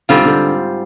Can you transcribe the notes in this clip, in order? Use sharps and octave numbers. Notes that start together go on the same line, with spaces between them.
G#2 D3 G3 C4 F4
D3